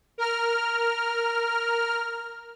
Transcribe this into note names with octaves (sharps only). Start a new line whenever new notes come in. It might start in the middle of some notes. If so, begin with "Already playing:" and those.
A#4 F6